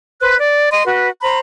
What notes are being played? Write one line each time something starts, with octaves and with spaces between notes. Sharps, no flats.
B4 C5 F#6
D5
D#5 C6
F#4 B4
C5 A#5 B5